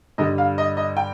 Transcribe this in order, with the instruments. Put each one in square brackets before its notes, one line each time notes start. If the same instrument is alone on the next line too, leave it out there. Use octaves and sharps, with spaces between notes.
[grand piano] G2 D3 G3 D#5
F5
D#5
D#5
G5